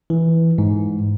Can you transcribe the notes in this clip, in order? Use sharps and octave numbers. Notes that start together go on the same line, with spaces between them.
E3
G#2